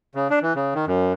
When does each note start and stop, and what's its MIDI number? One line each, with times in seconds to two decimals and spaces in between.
0.15 0.28 49
0.30 0.39 62
0.42 0.53 52
0.56 0.74 49
0.74 0.85 51
0.87 1.13 42